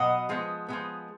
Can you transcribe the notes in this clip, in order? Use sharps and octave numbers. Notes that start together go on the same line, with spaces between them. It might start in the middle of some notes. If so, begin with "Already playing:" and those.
Already playing: B2 F#3 B3 D#5 F#5
F3 G#3 B3
F3 G#3 B3